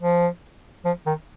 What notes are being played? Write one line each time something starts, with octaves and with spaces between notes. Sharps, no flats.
F3
F3
D#3